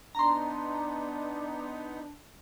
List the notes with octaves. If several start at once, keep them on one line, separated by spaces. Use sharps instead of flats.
B3 D4 D#4 A#5 C6